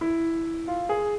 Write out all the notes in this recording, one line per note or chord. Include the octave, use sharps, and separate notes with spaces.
E4
F4
G#4